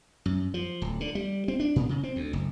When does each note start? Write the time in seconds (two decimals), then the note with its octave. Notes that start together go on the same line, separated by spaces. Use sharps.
0.26 F#2
0.54 F3
0.82 D1
1.01 D3
1.15 G3
1.48 C4
1.60 D4
1.76 A2
1.89 C#3
2.03 C4
2.16 D2
2.33 F#1